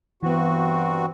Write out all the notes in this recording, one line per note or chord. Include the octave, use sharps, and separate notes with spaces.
G2 E3 B3 C4 F#4